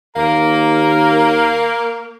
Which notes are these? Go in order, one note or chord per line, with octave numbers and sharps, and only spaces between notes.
D#2 A#3 A#5